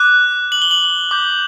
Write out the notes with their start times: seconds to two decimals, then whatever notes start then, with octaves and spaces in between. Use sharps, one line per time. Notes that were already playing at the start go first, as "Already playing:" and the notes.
Already playing: D6 F#6
0.52 F#7
0.62 G7
0.71 F#7
1.11 D6 G6